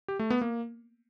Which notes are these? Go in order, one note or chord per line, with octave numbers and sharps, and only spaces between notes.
G4
A3
B3
A#3